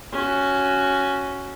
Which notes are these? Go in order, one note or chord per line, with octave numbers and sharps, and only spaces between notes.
C#4 F#4